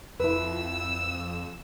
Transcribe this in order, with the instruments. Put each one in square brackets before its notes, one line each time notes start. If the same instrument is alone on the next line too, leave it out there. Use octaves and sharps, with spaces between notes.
[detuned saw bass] F2 [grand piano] E4 B4 [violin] E6